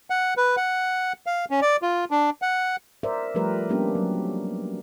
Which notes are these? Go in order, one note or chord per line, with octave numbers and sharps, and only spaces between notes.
F#5
B4
F#5
F5
C#4
D5
F4
D4
F#5
A#4 C5 D5 E5
F3 G3 A3 G4 A#4 B4
G3 A#3 B3 C#4 D4 G4
F#3